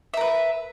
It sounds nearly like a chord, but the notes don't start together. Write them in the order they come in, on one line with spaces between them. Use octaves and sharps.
E5 A#4 B4